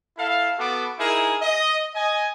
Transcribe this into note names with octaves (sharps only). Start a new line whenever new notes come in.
E4 A4 F5
B3 F#4 A4 D6
D#4 E4 G#4 A#4
D#5
D#5 G#5